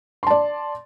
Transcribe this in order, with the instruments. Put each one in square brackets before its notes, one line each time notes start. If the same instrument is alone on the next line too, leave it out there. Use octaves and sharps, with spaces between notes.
[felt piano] C6
A5
D5